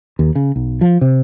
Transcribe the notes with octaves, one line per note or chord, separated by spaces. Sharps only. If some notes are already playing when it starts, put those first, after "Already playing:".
D#2
C#3
B1
F3
C3